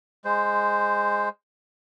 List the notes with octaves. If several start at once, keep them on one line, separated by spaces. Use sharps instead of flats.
G#3 C5